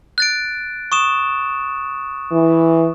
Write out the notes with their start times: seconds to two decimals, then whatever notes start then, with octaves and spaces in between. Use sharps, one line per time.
0.18 F#6 A6 D7
0.92 C#6 D#6 E7
2.31 E3